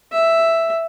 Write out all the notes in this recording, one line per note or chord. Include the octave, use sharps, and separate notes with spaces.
E5